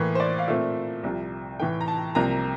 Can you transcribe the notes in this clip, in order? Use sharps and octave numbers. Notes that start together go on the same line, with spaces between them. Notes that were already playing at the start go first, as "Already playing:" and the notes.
Already playing: A2 E3 A#3
C5
D5
F5
A#2 A3 C4 E5
C2 C3 F3
A2 E3 A3 G5
A#5
A5
C2 C3 F3 A#3 A#5